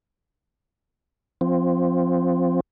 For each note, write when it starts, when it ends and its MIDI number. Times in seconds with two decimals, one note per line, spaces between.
1.41 2.60 53
1.41 2.60 60